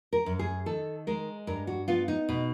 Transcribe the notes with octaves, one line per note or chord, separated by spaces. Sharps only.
A#4
F#2
G#4
D#3 A4
G#3 A#4
G2 A#4
F#4
B3 F4
D#4
B2